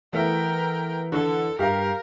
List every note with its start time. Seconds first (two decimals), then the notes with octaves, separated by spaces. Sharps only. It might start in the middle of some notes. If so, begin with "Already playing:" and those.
0.13 E3 A3 B3 E4 A#4 G5
1.12 D3 A4
1.59 G2 G4 A#4 F5